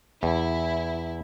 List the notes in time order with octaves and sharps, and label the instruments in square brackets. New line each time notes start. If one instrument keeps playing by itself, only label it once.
[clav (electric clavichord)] E2 [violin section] E4